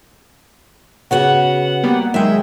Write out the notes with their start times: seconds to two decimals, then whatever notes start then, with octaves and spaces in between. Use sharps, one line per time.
1.11 C#3 B3 F#4 F#5
1.83 G3 A#3 B3
2.14 D#3 F#3 G#3 E5 G5